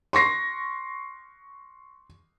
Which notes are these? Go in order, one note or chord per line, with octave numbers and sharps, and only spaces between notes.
C6 C#6 A#6 C7